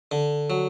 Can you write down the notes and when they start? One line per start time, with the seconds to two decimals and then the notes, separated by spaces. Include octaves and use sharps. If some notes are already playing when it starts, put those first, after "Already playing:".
0.11 D3
0.50 F#3